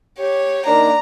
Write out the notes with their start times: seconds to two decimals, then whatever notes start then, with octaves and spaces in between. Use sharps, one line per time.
0.19 G4 C#5
0.66 D#3 A#3 D4 A#5